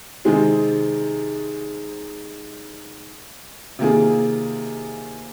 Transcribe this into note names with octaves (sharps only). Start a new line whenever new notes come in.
C3 D#3 G#3 C4 D#4
C3 D#3 A#3 F4 G#4